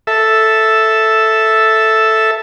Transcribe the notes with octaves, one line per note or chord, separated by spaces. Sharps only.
A4 E5